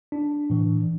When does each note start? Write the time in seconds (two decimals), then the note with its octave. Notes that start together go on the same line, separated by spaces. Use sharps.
0.12 D4
0.50 A2 E3